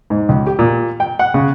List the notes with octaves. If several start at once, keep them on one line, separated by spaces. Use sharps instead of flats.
G#2
C#2
G4
A#2
G5
F#5
C#3